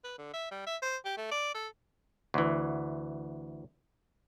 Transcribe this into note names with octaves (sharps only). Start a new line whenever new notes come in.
B4
D3
E5
G3
E5
C5
G4
A3
D5
A4
D2 E3